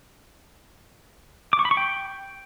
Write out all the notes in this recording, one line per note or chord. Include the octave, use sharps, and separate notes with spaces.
D6
C#6
B5
C#6
G5